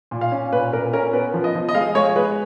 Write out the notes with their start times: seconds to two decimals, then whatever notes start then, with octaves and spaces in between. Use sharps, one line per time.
0.11 A#2
0.21 F5
0.32 C#4
0.52 A#2 B4
0.73 A#2 A#4
0.93 C#4 A#4
1.13 B3 B4
1.34 F3
1.44 D#5
1.55 F3
1.69 D#5
1.75 G#3 F5
1.95 G#3 C#5
2.16 G#3 B4